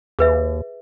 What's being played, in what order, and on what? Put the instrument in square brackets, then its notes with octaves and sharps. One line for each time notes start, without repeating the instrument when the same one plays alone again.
[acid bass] D#2 [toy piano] G#4 B4 E5